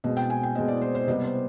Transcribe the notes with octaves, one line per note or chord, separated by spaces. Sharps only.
B2 G#3 C4 D#5
G5
G#5
G5
B2 G#3 C4 D#5
D5
C5
C5
C3 G3 B3 D#5
C5